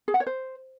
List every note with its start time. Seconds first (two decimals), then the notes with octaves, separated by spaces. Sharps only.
0.08 G#4
0.14 F#5
0.20 C#5
0.27 C5